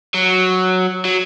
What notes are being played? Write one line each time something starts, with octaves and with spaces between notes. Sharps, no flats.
F#3
F#3